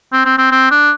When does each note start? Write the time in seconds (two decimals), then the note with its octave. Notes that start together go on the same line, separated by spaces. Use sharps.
0.13 C4
0.25 C4
0.38 C4
0.51 C4
0.71 D4